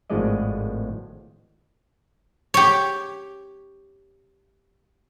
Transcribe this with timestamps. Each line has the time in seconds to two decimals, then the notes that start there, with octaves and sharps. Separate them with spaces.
0.10 G#1 A2 F3 G#3 D5 D#5
2.54 G4 C#5